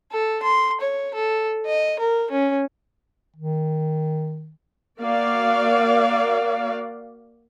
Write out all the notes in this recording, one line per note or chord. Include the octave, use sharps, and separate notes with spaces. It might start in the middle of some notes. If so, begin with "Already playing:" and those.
A4
C6
C#5
A4
D#5
A#4
C#4
D#3
A#3 F#4 D5 F5